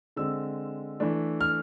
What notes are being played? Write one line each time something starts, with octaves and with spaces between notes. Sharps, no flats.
D3 G#3 C4 E6
E3 A3 D4
F6